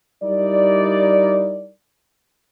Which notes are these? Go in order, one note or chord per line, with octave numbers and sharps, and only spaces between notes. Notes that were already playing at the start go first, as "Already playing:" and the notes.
G3 D#4 E4 A#4 D5